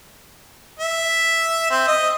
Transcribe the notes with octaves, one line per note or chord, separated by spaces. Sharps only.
E5
C4
D#5